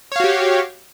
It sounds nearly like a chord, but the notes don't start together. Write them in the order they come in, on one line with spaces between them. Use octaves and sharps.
C#5 F5 F#4 G4